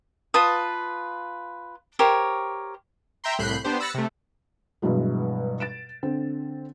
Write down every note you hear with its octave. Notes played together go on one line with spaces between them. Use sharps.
F4 B4 A5 D#6
G4 A#4 C5 C#5
E5 G5 A#5 C6
C2 A2 B5 F#6 G6 C7
B3 D4 G4 C5
B5 E6 F#6 A6 A#6 C#7
C3 A3
G2 B2 E3 F#3 G#3
A6 D7 E7
D3 C4